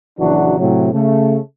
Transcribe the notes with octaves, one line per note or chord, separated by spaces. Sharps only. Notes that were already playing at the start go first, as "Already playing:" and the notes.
A#1 C#3 E3 F#3 D4 F#4
A2 C3 F#3
C#3 A3